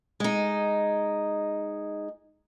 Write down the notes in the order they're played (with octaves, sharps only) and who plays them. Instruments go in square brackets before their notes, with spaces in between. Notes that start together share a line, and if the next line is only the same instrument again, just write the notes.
[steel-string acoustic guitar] G#3 D#4